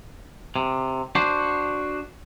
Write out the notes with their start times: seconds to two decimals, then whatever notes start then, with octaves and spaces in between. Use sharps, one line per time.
0.56 C3
1.15 D4 F#4 C5